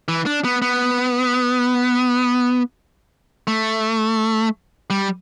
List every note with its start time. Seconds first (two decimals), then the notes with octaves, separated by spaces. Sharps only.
0.08 E3
0.26 D4
0.44 B3
0.62 B3
3.47 A3
4.90 G3